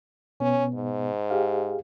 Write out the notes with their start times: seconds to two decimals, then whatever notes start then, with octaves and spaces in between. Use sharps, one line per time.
0.40 B2 B3 C#4
0.75 G#2
1.30 G4 G#4 F5